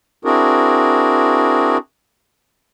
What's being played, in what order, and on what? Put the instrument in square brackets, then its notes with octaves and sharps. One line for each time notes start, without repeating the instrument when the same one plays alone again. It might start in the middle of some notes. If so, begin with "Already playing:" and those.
[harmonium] C4 D4 E4 F#4 G#4 A#4